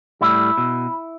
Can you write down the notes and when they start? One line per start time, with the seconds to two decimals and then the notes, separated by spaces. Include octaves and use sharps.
0.21 A2 G3 E4
0.58 B2